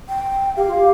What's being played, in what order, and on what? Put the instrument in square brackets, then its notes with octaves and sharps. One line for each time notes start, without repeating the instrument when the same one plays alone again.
[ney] G5
[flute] G4 [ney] F5
[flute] F4
G4